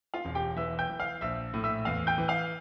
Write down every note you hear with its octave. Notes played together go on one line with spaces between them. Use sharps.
F4 F5
E1
G4 G5
E3 E5 E6
G5 G6
E3
F5 F6
A#1 E5 E6
A2
E5 E6
E2 F5 F6
G5 G6
E3
F5 F6